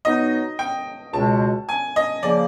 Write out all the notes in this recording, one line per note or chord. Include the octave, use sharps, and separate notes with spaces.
B2 F#3 B3 D#4 D#5
G5
C#2 B2 G#3 A5
G#5
D#5
C#3 F3 A#3 D5